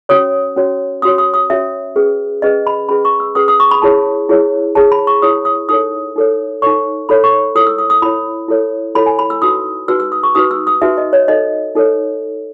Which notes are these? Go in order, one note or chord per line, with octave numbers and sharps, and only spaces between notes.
C#4 F#4 C#5 D#6
C#4 F#4 C#5
C#4 F#4 C#5 D#6
D#6
D#6
C#4 F#4 C#5 E5
C#4 G#4 B4
C#4 G#4 B4 D#5
B5
C#4 G#4 B4 B5
C#6
E6
C#4 G#4 B4 D#6
D#6
C#6
B5
E4 G#4 C#5 A5
E4 G#4 C#5
E4 G#4 C#5 A5
B5
C#6
E4 G#4 C#5 D#6
D#6
D#4 A4 C#5 D#6
D#4 A4 C#5
D#4 A4 C#5 C#6
D#4 A4 C#5 B5
C#6
E4 A4 C#5 D#6
E6
D#6
D#6
E4 A4 C#5 B5
E4 A4 C#5
E4 A4 C#5 B5
G#5
B5
E6
D#4 F#4 B4 D#6
D#4 F#4 B4 E6
E6
D#6
C#6
D#4 F#4 B4 D#6
E6
D#6
D#4 F#4 B4 E5
D#5
C#5
D#4 A4 C#5 D#5
D#4 A4 C#5